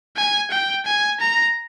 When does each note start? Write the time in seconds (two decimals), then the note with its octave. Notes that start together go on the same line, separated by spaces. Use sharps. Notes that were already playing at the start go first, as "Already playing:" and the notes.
0.17 G#5
0.51 G5
0.86 G#5
1.20 A#5